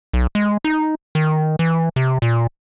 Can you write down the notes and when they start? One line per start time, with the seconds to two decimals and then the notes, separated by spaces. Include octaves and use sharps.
0.13 B1
0.35 G#3
0.64 D#4
1.15 D#3
1.59 E3
1.96 C3
2.22 A#2